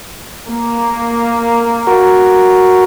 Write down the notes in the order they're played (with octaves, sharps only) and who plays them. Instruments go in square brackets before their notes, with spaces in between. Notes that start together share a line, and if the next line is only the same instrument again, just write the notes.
[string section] A#3
[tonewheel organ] F#4 A#4